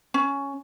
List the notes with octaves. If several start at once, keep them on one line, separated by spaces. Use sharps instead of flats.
C#4